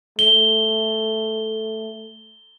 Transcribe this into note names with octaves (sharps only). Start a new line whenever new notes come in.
A3 G7